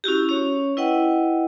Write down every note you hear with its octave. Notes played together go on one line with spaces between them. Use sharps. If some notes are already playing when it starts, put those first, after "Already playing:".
C#4 E4 F#4 G4
C#4 C#5
E4 B4 D#5 F#5 G5